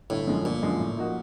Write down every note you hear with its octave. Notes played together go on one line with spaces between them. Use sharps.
G1 A2
F#2 D3 F3 G#3
G1 A#2
F#2 D3 F3 G#3
A2
F3 A#3 D#4 F#4